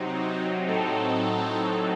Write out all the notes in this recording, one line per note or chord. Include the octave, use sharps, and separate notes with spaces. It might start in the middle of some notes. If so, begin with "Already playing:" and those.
Already playing: C3 F#3 C4 D#4
A2 F#3 C4 D#4 A4